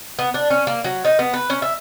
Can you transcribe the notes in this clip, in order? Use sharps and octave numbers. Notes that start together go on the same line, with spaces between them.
B3
D4
C#4
A#3
F#3
D#4
B3
B4
C#4
E5